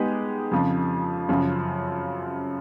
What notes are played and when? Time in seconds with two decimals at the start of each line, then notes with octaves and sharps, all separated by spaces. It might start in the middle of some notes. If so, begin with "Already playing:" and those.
Already playing: G#3 B3 D#4 G4
0.51 F2 C#3 F3
1.29 F#2 C#3 F3